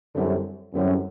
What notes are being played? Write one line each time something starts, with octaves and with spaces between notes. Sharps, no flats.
F#2 D3 G3 C4 E4 G4
F#2 D3 G3 C4 E4 G4